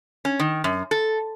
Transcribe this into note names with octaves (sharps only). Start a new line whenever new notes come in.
C#4
D#3
F#2
A4